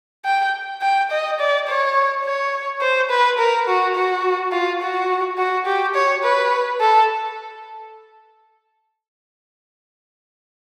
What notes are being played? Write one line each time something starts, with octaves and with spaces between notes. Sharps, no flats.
G5
G5
D#5
D5
C#5
C#5
C5
B4
A#4
F#4
F#4
F4
F#4
F#4
G4
C#5
B4
A4